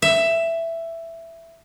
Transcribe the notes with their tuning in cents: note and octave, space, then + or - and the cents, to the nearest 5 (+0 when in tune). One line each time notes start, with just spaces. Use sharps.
E5 +10